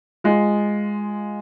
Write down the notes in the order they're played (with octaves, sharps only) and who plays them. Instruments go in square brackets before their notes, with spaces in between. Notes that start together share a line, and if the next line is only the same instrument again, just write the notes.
[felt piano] G#3 F4